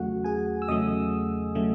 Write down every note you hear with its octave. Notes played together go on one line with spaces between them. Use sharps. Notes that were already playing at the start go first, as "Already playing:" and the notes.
Already playing: E2 C#3 F#3 A3 F#4 F#5
G#4 G#5
E6
E2 C#3 F#3 A3 D#5 D#6
C#3 F#3 A3